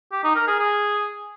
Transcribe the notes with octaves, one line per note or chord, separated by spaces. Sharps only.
G4
D#4
A#4
G#4
G#4